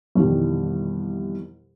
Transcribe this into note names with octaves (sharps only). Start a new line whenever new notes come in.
C2 F2 B2 D#3 E3 G3